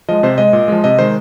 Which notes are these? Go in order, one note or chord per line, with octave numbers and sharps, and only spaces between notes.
F3 G#3 D#5
C3 C5
G#3 D#5
A#2
F3 G#3
C3 D#5
D#3 G#3 C5